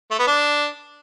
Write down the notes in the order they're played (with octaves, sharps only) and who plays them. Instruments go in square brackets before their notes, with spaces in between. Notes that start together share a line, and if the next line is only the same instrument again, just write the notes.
[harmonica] A3
B3
D4